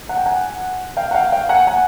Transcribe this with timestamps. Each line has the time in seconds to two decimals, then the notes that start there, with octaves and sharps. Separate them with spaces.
0.09 F#5
0.17 G5
0.26 F#5 G#5
0.97 F5 G5
1.11 F#5
1.14 F5 G5
1.32 F5 G5
1.49 F#5 G#5
1.67 F#5 G#5